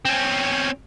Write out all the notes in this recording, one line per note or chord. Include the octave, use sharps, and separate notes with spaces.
C4 C#4